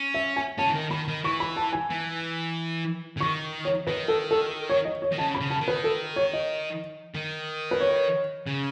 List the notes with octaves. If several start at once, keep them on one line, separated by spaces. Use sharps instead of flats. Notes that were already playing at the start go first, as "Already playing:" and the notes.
Already playing: C#4
E5
G#5
C#4 A5
E3
D#3
D#3 B5
D#3
E3 C#6
B5
A5
G#5
E3
C#3
D#3 C#6
C#5
D#3 B4
A4
A4
C#5
D#5
C#5
D#3
C#3 A5
B5
C#3
A5
D#3
B4
A4
C#5
D#5
D#3
B4
C#5
C#3